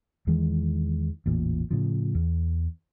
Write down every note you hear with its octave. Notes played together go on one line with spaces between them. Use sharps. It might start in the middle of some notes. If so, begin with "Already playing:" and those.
E2 D#3 E3 G#3
A1 E2 A#2
A2 C#3 F3
E2